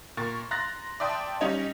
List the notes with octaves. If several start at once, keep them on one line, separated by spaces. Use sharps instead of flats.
A#2 A#4 C#6 A6
A#5 C6 F#6 A6 A#6
D5 E5 G5 A5 C6 D#6
G3 C#4 D#4 C#5 D#5